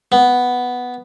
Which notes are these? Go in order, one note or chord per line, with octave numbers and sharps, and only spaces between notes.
B3